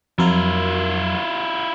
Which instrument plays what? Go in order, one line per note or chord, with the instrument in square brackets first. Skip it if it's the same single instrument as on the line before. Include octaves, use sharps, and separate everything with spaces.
[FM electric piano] F2 F#3 A#4 [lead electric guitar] E4 F4